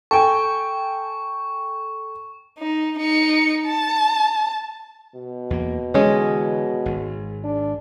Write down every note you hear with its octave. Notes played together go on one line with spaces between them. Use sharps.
A4 G5 G#5 C#6
D#4
D#4 C#7
A5
B2
E2 A#3
D3 E3 G#3 C#4
G#1
D4